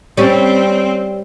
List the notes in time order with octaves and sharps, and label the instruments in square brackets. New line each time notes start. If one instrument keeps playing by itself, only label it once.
[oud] G3 C#4 [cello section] C4